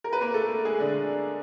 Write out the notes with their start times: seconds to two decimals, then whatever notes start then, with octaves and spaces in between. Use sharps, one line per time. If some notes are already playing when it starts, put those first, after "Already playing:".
0.04 A#4
0.13 B4
0.21 A#3 A#4
0.34 A3 A4
0.65 G#3 G#4
0.80 D3 D4